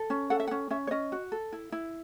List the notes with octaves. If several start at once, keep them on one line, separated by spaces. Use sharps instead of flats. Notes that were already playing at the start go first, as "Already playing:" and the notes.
Already playing: A4
C#4
A4 F#5
E5
F#5
C#4
C#4 E5
C#5
C#4 D#5
F#4
A4
E4
E4